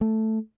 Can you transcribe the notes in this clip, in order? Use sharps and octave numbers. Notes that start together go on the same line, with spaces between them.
A3